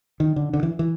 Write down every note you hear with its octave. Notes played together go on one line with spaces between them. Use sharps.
D#3
D3
D3
E3
E3